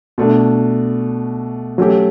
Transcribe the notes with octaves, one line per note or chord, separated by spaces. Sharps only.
B2 A3 D4
F#3 A3 C#4 G4